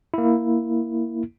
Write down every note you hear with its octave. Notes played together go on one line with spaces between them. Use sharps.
A#3 E4